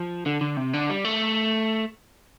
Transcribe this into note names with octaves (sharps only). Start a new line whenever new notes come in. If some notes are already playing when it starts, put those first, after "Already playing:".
Already playing: F3
D3
D3
C3
D3
G3
A3